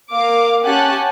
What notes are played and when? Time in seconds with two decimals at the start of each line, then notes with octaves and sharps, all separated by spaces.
0.11 A#3 F5 D6
0.66 C#4 G4 F#5 G#5 A5 F#6